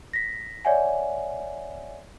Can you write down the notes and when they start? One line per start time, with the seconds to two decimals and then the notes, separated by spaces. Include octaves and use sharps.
0.13 A#6 B6
0.65 C#5 D5 E5 F#5 G#5